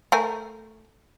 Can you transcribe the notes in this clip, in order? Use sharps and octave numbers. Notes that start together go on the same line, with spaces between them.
A3 A#4 G#5